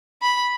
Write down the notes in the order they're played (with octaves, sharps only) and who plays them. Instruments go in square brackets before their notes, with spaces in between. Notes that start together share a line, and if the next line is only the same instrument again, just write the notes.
[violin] B5